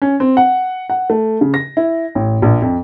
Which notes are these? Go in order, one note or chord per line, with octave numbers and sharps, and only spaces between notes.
C#4
C4
F#5
F#5
A3
C#3
A#6
E4
A1
A#1
F2